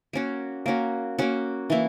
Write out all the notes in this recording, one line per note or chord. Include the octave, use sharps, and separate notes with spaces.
A#3 C#4 F#4
A#3 C#4 F#4
A#3 C#4 F#4
E3 A#3 E4